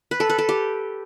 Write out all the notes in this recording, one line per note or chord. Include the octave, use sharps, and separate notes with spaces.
B4
A4
B4
A4
G4